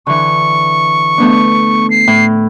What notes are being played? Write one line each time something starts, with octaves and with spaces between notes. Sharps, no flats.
D3 E3 C#6
A3 B3 D4
C7
A2